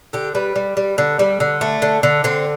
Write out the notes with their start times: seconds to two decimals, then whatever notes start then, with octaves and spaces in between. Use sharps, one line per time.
0.13 D3 G4
0.35 G3 B4
0.56 G3
0.77 G3
0.98 D3
1.19 G3
1.40 D3
1.61 A3
1.82 D3
2.03 D3
2.24 D3 C4